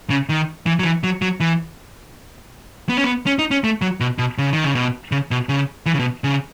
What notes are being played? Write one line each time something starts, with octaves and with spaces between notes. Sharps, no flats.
C#3
D#3
E3
F#3
E3
F#3
F#3
E3
B3
C#4
B3
C#4
D#4
C#4
A3
F#3
B2
B2
C#3
D#3
C#3
B2
C#3
B2
C#3
E3
C#3
B2
C#3